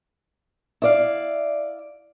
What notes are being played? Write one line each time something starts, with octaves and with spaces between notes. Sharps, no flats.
E4 D5 F5